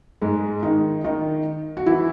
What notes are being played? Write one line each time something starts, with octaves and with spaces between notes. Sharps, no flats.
G#2 G#3
D#3 D#4
D#3 D#4
F#4
E3 E4